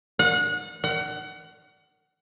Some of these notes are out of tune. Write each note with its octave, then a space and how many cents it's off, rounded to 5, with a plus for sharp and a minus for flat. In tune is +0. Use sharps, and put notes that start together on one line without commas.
F#5 -30
F#5 +25